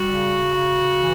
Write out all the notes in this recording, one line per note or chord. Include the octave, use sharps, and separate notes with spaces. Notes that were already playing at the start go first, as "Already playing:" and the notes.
Already playing: G3 F#4
C#3
C#3
E3